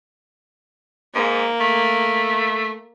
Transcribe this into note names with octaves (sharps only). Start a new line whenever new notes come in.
G#2 A#3
A3